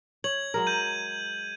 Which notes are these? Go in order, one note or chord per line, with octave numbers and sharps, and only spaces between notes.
C#5 G#6 F#7
F#3 G#3 A#4
G6 D#7